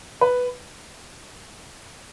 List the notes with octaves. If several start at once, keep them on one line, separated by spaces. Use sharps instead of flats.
B4